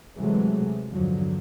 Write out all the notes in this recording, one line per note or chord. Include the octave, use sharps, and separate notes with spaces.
C3 E3 F#3 G#3 A3
E2 G2 D3 F3 F#3